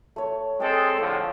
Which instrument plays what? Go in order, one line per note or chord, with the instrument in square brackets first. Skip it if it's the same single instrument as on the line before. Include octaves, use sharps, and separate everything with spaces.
[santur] A3 C#5
[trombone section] G#3 C4 A4 [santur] G5 D#6
[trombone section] A2 D3 F3 [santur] C#5